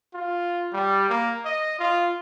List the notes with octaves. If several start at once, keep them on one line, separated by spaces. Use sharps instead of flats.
F4
G3
A#3
D#5
F4